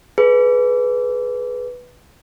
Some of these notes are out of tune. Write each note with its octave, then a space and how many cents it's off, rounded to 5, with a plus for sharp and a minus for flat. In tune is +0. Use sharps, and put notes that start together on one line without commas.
G#4 +30 B4 +0